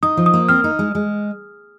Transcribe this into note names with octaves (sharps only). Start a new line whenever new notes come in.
D#4 D#6
F3
D#6
A#3
C4 F6
D#4
G#3
G#3